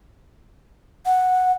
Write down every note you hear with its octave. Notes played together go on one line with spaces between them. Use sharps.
F#5